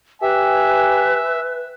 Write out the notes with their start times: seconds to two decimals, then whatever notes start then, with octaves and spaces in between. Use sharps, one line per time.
0.22 G4 B4 E5 G#5